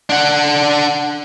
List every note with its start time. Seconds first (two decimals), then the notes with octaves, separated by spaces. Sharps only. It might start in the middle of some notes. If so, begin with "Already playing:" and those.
0.10 D4 F#5